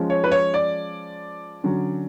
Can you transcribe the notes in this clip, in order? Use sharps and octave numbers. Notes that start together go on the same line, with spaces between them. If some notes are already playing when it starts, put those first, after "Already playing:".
Already playing: F3 G#3 C#4
C#5
B4
C#5
D5
D3 F#3 C#4